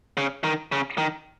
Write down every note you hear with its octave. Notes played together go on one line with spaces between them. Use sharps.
C#3
D#3
C#3
D#3